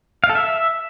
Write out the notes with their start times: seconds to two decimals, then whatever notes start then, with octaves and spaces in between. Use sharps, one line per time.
0.24 F5
0.29 A4
0.35 E5